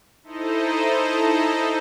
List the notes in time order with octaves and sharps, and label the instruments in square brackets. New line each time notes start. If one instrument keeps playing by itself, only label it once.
[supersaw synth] D#4 E4 A4 C5 D#5